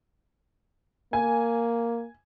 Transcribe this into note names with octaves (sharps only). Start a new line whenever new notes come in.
A#3 G#5